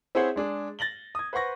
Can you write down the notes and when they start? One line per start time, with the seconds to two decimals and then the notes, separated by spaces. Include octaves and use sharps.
0.15 C4 E4 G#4 C5 C#5 F#5
0.36 G#3 D4 G#4
0.79 A6 A#6 F#7 G7
1.15 D#6 G#6
1.33 B4 C5 F#5 C#6 A#6